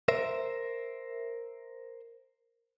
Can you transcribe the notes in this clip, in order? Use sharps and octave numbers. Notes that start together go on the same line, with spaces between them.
A#4 C5 E5